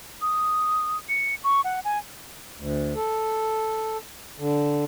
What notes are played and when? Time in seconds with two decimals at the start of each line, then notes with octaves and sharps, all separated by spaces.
0.22 D#6
1.09 C#7
1.44 C#6
1.64 F#5
1.85 G#5
2.57 D2
2.95 A4
4.37 D3